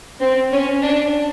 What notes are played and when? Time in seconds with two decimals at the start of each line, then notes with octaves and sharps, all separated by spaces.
0.20 C4
0.52 C#4
0.83 D4